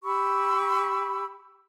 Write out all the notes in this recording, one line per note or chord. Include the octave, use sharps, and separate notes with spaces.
G4 B5 C#6 E6